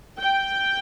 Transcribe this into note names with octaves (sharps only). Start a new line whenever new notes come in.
G5